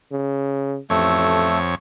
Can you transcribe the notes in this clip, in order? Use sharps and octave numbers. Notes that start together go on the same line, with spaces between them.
C#3
A1 F2 A3 A4 C#5